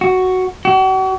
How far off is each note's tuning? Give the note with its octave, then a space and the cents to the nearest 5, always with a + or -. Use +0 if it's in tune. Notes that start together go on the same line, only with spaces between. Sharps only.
F#4 +5
F#4 +40